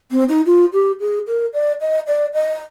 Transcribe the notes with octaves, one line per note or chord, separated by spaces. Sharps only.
C4
D#4
F4
G4
G#4
A#4
D5
D#5
D5
D#5